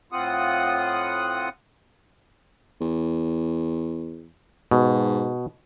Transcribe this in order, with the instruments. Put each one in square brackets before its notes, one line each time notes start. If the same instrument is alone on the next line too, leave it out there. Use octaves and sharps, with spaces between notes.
[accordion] A2 C4 F4 F#5 D#6
[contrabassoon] E2
[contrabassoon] G#2 [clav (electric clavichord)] B2